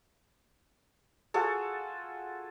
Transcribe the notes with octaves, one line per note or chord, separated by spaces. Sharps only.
F4 F#4 G#4 A4